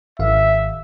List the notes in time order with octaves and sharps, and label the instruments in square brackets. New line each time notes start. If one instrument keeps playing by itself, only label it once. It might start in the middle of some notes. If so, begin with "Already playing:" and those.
[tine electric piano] G#1 F5 [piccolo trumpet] E5